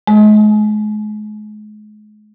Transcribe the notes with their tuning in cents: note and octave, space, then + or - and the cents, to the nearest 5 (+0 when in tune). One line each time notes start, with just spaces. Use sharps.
G#3 +35